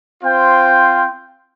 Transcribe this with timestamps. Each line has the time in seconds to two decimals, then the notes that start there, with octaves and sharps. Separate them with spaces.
0.23 C4 F4 C5 G5